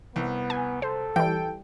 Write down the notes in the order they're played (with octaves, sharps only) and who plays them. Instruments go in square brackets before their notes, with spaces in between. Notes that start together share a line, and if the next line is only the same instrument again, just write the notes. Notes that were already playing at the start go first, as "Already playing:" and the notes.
[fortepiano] C2 [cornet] B3
[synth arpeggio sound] G#5
[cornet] A4 [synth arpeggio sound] C5
[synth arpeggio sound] E3 G3 [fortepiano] G5